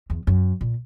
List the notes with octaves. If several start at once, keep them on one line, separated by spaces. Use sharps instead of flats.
E2
F#2
A#2